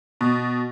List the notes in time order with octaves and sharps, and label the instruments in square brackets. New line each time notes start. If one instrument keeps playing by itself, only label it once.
[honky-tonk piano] B2